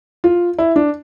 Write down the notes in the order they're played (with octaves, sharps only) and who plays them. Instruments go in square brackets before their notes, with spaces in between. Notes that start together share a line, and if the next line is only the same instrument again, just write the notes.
[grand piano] F4
E4
D4